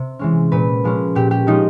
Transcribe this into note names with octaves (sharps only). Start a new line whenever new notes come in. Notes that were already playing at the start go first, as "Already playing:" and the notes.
Already playing: C3
E3 G#3 C#4
A#2 B4
F3 G#3 C#4
A#2 G4
G4
F3 G#3 C#4 D#4